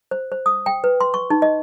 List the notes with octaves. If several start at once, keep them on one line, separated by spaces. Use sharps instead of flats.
C5
C5
D#6
G5
B4
C6
C#6
D#4
D#5